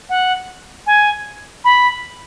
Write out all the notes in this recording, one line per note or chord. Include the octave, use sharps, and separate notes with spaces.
F#5
G#5
B5